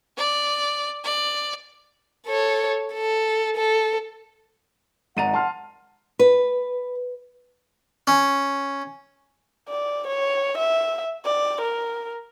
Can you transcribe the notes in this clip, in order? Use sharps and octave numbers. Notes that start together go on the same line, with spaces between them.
D5
D5
A4 C#5
A4
A4
G#1 D#4 D5 F#5 A#5 D#7
A5 C6 F6
B4
C#4
D5
C#5
E5
D5
A#4